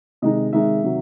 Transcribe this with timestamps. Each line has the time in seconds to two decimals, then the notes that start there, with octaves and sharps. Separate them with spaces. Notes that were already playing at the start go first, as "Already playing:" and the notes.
0.22 C3 D#3 G#3 D#4 D#5
0.52 C3 D#3 G#3 D#4 E5
0.83 C3 D#3 F#3